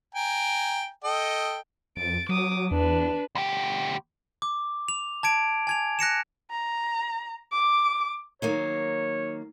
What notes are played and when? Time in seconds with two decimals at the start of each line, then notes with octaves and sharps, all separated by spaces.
0.15 G5 G#5 A#5
1.04 A4 D#5 G5
1.97 F2 A6 D7
2.29 F#3 D6 D#6
2.71 E2 D4 B4
3.35 D2 G4
4.42 D6
4.88 F7
5.23 A5 G#6 D7
5.67 G#5 G#6 F7
5.99 F#6 A#6 C#7 E7
6.51 A#5
7.52 D6
8.42 D#3 F#3 A#3 C#5